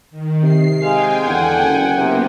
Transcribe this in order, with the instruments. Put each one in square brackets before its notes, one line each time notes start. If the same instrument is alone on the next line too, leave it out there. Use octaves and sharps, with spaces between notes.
[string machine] D#3
[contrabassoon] C3 [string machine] C7
[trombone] G#3 [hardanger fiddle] F5 [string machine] G5 G#5
[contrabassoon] E2 [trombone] D3 [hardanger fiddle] F#5
[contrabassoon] F#1
[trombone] C3 [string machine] A#3 B3